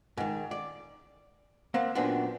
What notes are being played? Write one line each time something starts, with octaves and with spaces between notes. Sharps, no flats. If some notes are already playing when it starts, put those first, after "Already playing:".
G#2 D#3
D5
A#3 C4 F5 F#5
F#2 A#2 B3 C4 D4